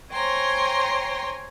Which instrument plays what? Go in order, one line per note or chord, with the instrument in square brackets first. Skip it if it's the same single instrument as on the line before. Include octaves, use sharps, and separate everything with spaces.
[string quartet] C5 C#5 G5 G#5 A#5 C6